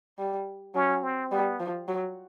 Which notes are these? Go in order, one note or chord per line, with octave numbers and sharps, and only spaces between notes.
G3
F#3 C#4
C4
G3 B3
F3
F#3